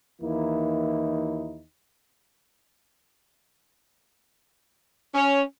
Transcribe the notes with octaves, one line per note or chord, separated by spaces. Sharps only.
D#2 E3 A#3 D#4 E4
C#4